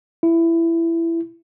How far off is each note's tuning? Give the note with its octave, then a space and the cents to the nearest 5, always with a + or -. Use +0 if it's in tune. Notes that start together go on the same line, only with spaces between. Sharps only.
E4 +15